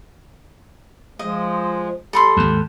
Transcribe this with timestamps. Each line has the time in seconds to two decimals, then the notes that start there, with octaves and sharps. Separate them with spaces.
1.19 F3 G#3 D#5
2.13 G3 A4 B5 C6
2.37 G#1 D#2